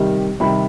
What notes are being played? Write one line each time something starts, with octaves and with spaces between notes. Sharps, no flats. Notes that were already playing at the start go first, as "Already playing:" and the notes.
Already playing: C3 D#3 G3
C3 D#3 G3 B5